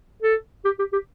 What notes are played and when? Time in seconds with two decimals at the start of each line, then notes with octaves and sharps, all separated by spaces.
0.22 A4
0.65 G4
0.79 G4
0.93 G4